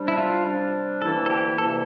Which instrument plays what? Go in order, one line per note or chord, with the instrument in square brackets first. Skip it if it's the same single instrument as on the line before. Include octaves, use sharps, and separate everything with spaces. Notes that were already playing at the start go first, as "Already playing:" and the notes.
Already playing: [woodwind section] C3 G3 D4
[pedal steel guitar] E4
F4
[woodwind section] C3 G3 D4
[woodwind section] D2 C3 E3 A#3 E4 [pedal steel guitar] A4
[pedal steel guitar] A4
G4
[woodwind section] D2 C3 E3 A#3 E4 [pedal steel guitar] A4